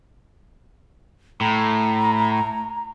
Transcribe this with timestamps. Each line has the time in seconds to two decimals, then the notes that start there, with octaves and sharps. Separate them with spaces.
1.41 A2 A#5